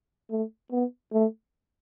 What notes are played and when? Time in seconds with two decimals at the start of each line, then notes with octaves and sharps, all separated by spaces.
0.31 A3
0.72 B3
1.13 A3